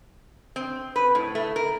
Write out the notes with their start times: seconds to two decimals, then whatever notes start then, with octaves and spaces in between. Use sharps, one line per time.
0.56 C4
0.96 B4
1.15 A2
1.35 A3
1.56 A#4